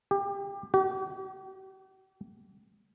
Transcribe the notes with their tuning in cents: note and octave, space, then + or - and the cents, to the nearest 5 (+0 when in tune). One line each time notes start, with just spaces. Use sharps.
G4 +25
G4 -45